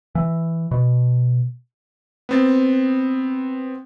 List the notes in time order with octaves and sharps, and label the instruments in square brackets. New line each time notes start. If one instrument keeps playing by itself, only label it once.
[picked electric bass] E3
B2
[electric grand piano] B3 C4 A6